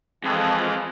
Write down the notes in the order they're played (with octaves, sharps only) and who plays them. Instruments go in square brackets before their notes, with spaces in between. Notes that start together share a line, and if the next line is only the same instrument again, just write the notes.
[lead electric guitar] F2 [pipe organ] E3 F3 G#3